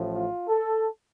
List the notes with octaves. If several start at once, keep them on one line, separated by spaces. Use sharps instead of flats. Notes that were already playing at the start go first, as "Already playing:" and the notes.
Already playing: A1 A2 F3
F4
A4